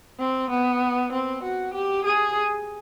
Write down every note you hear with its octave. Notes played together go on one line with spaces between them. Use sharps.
C4
B3
C4
F#4
G4
G#4